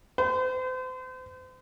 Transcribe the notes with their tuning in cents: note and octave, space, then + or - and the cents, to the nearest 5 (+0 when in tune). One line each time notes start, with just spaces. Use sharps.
C5 -40